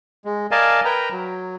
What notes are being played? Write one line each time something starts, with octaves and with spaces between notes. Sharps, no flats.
G#3
A#4 D5 D#5 F5 G#5 A5
A#4 B4 G5 A#5
F#3